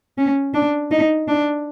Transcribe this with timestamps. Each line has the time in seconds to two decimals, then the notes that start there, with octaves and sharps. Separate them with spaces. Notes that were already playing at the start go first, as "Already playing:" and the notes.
0.18 C#4
0.54 D4
0.91 D#4
1.28 D4